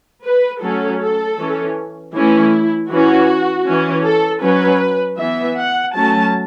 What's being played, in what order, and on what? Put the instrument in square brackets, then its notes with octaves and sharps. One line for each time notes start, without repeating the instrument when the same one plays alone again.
[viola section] B4
F#3 A3 C#4 A4
A4
E3 C#4
E3 A3 C#4 E4
E3 C#4 F#4
E3 C#4
A4
F#3 C#4 B4
E3 B3 E5
F#5
F#3 A3 C#4 A5